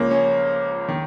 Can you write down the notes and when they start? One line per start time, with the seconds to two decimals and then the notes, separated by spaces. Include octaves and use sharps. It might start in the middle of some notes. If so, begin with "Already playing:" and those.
Already playing: C#2 C#3 F3 A#3 C#4
0.11 C#4
0.89 D#3